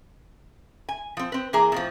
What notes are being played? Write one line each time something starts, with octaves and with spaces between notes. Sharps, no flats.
G#5
F3 C4
C4 B4
E3 A#3 G#4 A#5
F2 A2 F3